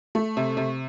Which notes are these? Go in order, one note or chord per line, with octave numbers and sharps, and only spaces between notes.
A3
C3
C3